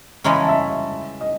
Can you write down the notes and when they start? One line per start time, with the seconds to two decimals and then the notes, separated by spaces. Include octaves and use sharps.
0.24 C#3 E3 G#3 C#4 A#5
0.33 B5
0.41 A5
0.48 E5
1.21 D#5